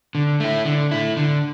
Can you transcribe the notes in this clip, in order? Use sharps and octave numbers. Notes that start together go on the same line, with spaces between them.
D3
A3 E4
D3
A3 E4
D3